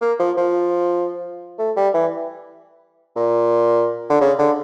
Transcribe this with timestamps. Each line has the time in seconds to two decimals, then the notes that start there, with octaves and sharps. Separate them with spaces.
0.01 A#3
0.19 F3
0.37 F3
1.59 A3
1.76 G3
1.94 E3
3.16 A#2
4.10 D3
4.21 C#3
4.39 D3